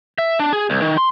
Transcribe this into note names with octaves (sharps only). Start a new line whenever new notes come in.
E5
D4
G#4
C2
D#3
C6